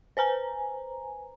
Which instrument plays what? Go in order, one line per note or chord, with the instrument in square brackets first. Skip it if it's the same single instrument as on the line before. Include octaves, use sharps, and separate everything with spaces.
[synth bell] B4 C5 G#5 A#5